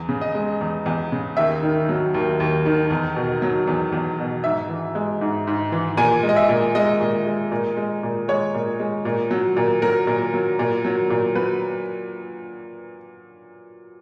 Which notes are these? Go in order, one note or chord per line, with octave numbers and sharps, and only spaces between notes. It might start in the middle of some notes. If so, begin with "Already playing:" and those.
Already playing: E2
C#3
D#5
G#3
E2
E2
C#3
D#2 E5
D#3
F#3
D#2
D#2
D#3
E2
B2
F#3
E2
E2
B2
G#2 E5
E3
G#3
G#2
G#2
E3
A#2 G#5
G#3
D#5
E5
A#2
G#3 D#5
A#2
G#3
A#2
G#3
A#2
G#3 C#5
A#2
G#3
A#2
F#3
A#2
F#3 A#4
A#2
F#3
A#2
F#3
A#2
F#3 B4